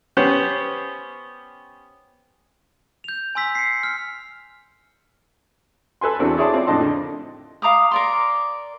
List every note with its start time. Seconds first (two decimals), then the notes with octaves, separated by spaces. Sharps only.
0.17 B3 C#4 G4 C5
3.04 G6 F7
3.35 G#5 C6 E6 B6
3.55 C7 C#7
3.83 F6
6.01 A4 B4 G#5 C6
6.19 E2 C4 D4 F#4 A4
6.37 E4 G#4 C#5 D5 A5 C6
6.53 C4 F4 D5
6.67 F2 A2 D4 D#5 A5 C6
6.81 D3
7.62 F5 A#5 D6 D#6
7.91 A#4 D5 C6